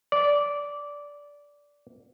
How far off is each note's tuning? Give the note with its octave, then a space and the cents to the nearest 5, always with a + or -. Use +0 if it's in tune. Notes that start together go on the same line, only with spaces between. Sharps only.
D5 -15